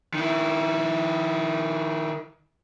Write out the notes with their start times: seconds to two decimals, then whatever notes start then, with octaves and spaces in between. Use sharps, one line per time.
0.14 D#3 E4